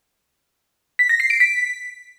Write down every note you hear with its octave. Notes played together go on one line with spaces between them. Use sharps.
B6
A#6
C7
D7
B6